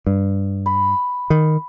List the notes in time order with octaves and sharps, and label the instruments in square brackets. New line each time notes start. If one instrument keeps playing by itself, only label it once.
[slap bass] G2
[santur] B5
[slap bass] D#3